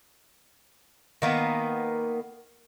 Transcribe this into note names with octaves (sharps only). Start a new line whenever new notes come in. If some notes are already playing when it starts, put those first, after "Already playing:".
D#3 A#3 B3